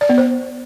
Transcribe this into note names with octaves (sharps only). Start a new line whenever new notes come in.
D5
B3
C5